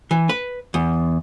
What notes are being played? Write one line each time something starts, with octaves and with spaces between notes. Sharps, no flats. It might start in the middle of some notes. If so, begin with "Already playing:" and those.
E3
B4
E2